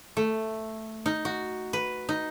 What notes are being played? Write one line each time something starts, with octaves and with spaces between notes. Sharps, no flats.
A3
D#4
F#4
B4
D#4